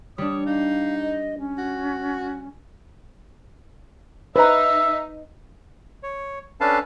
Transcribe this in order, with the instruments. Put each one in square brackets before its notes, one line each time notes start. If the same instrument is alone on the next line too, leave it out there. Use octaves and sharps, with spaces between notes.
[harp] G3 D4 [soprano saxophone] C#5 [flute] D#6
[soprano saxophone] D#4 [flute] F5
[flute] D#5
C#4
[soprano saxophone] F#4
[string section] D#4 [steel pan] B4 [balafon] C5 A#5 [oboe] E5
[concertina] C#5
C#4 D4 A4 B4 F5 A5